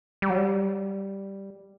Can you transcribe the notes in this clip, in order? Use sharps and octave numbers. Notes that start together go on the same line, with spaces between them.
G3
F#3
G3